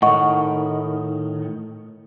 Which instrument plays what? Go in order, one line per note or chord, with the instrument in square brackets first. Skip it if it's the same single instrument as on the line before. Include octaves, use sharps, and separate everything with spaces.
[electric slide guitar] A2 D#3 [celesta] D#5 F#5 C#6